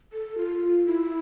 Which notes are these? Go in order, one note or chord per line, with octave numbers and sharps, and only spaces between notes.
A4
F4
E4